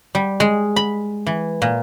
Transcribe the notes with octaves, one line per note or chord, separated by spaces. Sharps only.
G3
G#3
B5
E3
A#2